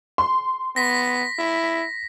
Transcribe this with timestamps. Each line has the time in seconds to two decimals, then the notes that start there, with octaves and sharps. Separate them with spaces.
0.18 C6
0.76 B3 A#6 B6
1.39 E4